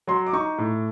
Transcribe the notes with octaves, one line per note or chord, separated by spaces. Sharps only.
F#3 C6
D6
D#4 C#6
A2